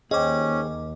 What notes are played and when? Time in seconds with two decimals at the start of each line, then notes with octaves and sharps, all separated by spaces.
0.11 D#2 C#4 G#4 C5 D#5 G5 D6